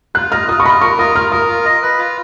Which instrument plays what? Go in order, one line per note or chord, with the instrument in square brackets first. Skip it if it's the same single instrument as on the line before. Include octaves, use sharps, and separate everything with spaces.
[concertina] F4 [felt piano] F#6
[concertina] D#5 [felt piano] F6
[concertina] F4 [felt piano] D#6
[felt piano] C#6
[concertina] D#5 [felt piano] B5
[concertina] A#4 [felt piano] C#6
[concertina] F4 [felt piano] D#6
[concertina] A#4 [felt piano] F6
[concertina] A#4 [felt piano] D#6
[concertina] F4
D#5
B4
F4